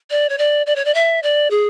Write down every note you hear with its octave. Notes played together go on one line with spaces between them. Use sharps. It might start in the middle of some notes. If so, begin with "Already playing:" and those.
D5
C#5
D5
D5
C#5
D5
E5
D5
G#4